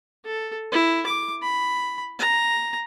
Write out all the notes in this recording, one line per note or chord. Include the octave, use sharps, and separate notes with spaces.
A4
E4
D6
B5
A#5